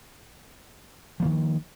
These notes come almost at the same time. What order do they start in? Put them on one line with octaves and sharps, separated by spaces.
F3 A#3 D#3